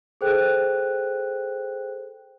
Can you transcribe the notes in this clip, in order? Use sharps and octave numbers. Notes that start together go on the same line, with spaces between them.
G#4 A4 C5 G5 F#6